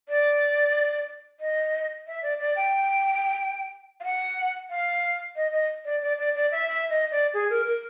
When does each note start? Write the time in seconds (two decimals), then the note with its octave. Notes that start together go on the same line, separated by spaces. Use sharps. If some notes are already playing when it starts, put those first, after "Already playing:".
0.09 D5
1.40 D#5
2.07 E5
2.22 D5
2.40 D5
2.56 G5
4.00 F5
4.04 F#5
4.70 F5
5.36 D#5
5.52 D#5
5.85 D5
6.02 D5
6.18 D5
6.35 D5
6.52 E5
6.68 E5
6.90 D#5
7.11 D5
7.34 G#4
7.50 A#4
7.67 A#4